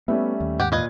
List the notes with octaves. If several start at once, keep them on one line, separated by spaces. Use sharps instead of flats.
G3 A3 B3 C#4 E5
D#2
G#2 G4 F#5 G5
A#2 B4 D#5 F5 G#6